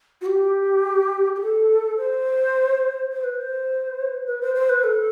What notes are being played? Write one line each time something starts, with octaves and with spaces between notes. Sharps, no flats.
F#4
G4
G4
A4
C5
C5
B4
C5
B4
C5
C5
B4
A4